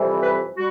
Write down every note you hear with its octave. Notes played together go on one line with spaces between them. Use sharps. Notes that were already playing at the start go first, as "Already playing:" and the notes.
Already playing: F2 C3 E3 G3
B4
G3 F#4